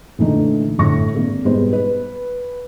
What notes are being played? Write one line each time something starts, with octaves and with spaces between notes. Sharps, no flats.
A#2 D3 E3 A3 D#4
G1 A2 C#6 A#6
G#1 A#3
G#2 B2 G3 B3 G#4 C5
B4